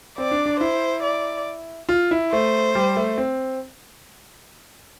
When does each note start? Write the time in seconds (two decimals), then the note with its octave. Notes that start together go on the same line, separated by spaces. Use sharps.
0.18 C4 D5
0.31 D4
0.46 D4
0.60 E4 C5
1.03 D5
1.89 F4
2.11 E4
2.32 A3 C5
2.75 G3
2.96 A3
3.18 C4